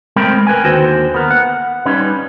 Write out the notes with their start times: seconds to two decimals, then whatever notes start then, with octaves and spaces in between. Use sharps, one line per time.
0.16 G#3 A3 C4 A#4 G5 B5
0.47 A#4 B4 G5 G#5
0.64 D#2 D3 F#4 A4 C5 G5
1.14 B3 A#4
1.31 F#5
1.85 G3 C#4 D#4 B4